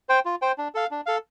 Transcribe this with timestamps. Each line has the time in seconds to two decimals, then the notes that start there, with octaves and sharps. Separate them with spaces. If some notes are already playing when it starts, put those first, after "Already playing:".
0.09 C5 G5
0.25 F4
0.42 C5 G5
0.58 D4
0.75 A4 F5
0.91 D4
1.06 A4 F5